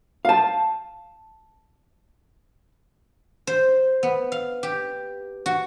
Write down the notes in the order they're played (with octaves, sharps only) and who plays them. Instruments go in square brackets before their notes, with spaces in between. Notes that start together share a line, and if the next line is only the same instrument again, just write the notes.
[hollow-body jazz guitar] F5 A5
[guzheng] C5
B3
F5
G4
F#4